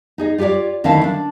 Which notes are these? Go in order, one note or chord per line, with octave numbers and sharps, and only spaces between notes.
D#4 G#4 D#5
F4 G4 A4 C#5 D5
D2 D#3 C#4 E4 F5 A5
D4